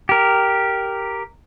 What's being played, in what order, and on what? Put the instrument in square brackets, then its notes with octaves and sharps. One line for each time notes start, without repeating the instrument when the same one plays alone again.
[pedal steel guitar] G4 A#4